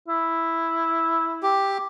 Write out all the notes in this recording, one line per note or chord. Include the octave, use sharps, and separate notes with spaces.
E4
G4